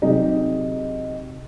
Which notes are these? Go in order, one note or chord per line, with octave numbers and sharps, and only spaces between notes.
C3 F#3 D#4 G4 G#4